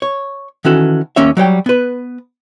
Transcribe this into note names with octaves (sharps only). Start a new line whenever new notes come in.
C#5
D#3 E3 C#4 F#4 A4
D#2 A#3 C#4 C#5 E5
F#3 G3 C#5 G5
B3 B4